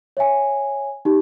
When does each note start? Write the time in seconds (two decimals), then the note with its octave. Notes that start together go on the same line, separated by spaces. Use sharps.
0.17 C#5 E5 G#5
1.05 D#4 G4